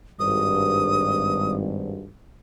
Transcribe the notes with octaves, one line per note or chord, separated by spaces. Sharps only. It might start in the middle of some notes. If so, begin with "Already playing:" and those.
G#1 G2 D#6